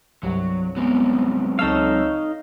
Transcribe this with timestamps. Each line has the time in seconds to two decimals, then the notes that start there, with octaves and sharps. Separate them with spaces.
0.23 C2 G2 F#3
0.77 F#3 G#3 B3 C4
1.59 C#2 D#4 A4 C#5 F5 E6